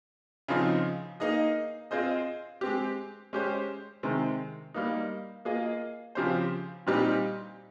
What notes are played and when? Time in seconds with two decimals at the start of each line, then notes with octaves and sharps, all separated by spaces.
0.48 C#3 F3 C4 D#4
1.20 A#3 D#4 G#4 D#5
1.91 C4 F4 G#4 C5 D#5
2.61 G#3 C4 G4
3.33 G#3 C#4 G4 C5
4.03 C3 D#3 G#3 C4
4.74 G3 A#3 D#4
5.45 A#3 F4 G#4 D#5
6.15 C#3 F3 C4 G4 C5
6.87 A#2 G3 C4 D#4 G4